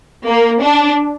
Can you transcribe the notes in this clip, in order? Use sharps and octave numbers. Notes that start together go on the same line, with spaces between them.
A#3
D4